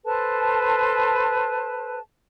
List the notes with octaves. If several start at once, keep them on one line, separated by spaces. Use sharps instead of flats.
A4 B4 C5 A5